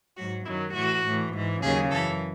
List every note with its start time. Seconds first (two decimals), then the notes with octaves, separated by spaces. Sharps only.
0.17 G#2 F#3 F#4
0.46 F#2 D#3 F#3 E4
0.75 A2 E3 F#4
1.05 A2 E3
1.34 G#2 E3
1.63 D#2 C#3 F#3 G#4
1.92 F#2 E3 A4